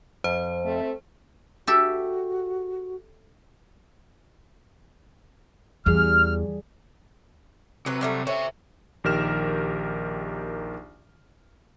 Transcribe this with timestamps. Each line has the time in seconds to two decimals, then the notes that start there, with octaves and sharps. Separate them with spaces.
0.24 F2 C5
0.65 A3 C4
1.67 F#4 G4 A4 E5
5.86 E2 G3 G#4 F6
7.86 C3 F#3 B4
8.01 F#3 G3 A3
8.27 C5 C#5 E5
9.04 A#1 D#3 G4 A#4 F6 E7